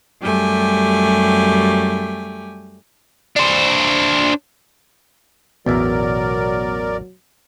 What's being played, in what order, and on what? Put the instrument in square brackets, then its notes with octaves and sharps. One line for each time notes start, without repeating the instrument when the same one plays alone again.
[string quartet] F#2 G3 A3 G4 G#5
[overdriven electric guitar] D4 C5
[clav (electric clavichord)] A1 E2 E5 [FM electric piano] B2 [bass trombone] F#3 [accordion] A#4 D5